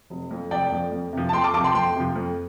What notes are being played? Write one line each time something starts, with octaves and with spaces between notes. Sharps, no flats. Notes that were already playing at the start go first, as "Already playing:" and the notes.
F1
F2 F3
F1 D5 G5
F2 F3
F2
C3 F3
A5
F2 G5 C6
A5 D6
C3 F3 A5 D6
G5 C6
F2 G5 C6
C3 F3
F2